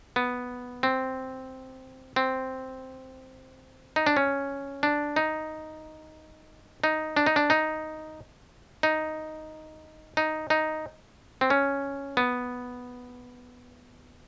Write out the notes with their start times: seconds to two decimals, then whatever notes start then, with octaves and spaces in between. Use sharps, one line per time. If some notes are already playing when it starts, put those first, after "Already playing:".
0.16 B3
0.83 C4
2.16 C4
3.96 D#4
4.07 D4
4.17 C#4
4.83 D4
5.16 D#4
6.84 D#4
7.17 D4
7.26 D#4
7.36 D4
7.50 D#4
8.83 D#4
10.17 D#4
10.50 D#4
11.41 C4
11.50 C#4
12.17 B3